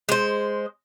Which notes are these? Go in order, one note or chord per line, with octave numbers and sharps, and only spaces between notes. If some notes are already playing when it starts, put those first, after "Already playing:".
G#3 C5